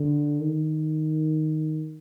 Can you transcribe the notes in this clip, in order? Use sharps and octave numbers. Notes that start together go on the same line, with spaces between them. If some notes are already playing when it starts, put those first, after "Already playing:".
Already playing: D3
D#3